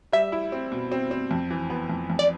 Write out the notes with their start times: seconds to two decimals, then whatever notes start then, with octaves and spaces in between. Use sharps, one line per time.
0.12 G3 E5
0.32 E4
0.52 C4
0.72 B2
0.92 C4
1.11 C4
1.31 F2
1.50 E3
1.70 B3
1.90 F2
2.10 F2
2.19 D5